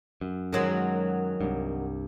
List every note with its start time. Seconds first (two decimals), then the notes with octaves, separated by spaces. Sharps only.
0.21 F#2
0.53 D#3 F#3 G#3
1.41 C2 G2